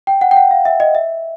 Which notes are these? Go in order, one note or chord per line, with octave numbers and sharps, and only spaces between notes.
G5
F#5
G5
F#5
F5
E5
D#5
E5